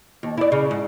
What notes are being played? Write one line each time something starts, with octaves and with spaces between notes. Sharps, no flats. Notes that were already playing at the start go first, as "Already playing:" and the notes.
D#2
E4 D5
C#3
G#2